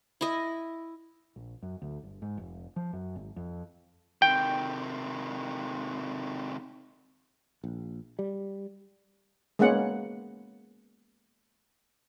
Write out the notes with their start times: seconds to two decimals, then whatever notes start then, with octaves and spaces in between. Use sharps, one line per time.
0.21 E4 D#5
1.36 A#1
1.63 F#2
1.82 D2
2.03 G1
2.22 G#2
2.37 F1
2.76 F3
2.93 F#2
3.16 G#1
3.36 F2
4.22 C3 D#3 G5
7.64 A#1
8.19 G3
9.59 G#3 A#3 B3 C#4 F#5